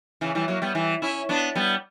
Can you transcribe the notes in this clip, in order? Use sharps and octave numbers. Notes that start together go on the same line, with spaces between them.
C#3 E3
E3 G3
F#3 A#3
G3 B3
E3 G3
C#4 E4
B3 D4
G3 B3